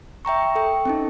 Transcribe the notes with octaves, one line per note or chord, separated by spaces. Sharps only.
E5 G5 A#5 C#6
A4 G5
C4 C#4 D#4